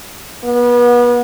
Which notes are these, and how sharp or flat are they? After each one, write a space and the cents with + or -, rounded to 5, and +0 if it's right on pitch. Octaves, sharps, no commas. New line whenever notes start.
B3 -30